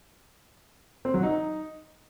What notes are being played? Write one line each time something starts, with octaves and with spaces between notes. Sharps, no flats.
C4
F#3
D#4